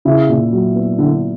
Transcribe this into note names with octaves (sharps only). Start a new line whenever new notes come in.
C#3 E4
A#2
F#3
B3
D3 E4